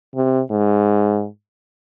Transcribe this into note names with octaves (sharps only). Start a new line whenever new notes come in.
C3
G#2